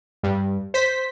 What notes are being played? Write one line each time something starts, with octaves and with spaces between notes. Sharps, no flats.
G2
C5 B6